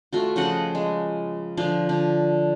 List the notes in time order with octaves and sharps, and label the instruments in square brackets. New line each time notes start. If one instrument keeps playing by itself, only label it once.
[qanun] A3 F4 F#4
C#3 F3 D#5 F#5
G#3
D3 F3 D4
D3